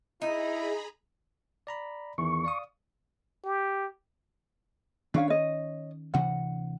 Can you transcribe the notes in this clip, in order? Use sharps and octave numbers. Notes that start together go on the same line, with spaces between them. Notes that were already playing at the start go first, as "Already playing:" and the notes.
D#4 E4 G#4 D#5 A#5 B5
D5 A#5 B5
E2 D#3 C#6
D5 F5 D#6
G4
D#3 C#4 D4 C#5 F5
C#5 D#5
D2 C3 E3 F#5